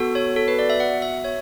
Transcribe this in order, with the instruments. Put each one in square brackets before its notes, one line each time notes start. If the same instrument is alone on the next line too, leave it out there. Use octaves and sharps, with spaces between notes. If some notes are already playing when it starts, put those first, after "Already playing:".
Already playing: [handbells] B3 F#4 A4
C#5
A4
B4
D5
E5
F#5
E5
C#5